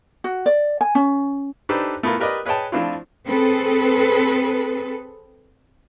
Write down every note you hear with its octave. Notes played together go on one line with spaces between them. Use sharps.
F#4
D5
G#5
C#4
D4 D#4 G4 A4 B4 C5
A3 B3 E4 F4 A#4
G4 A#4 B4 D5 D#5
G#4 B4 C#5 D#5 G5 A5
F3 A3 C4 D4 E4 F4
C4 G#4 A4 B4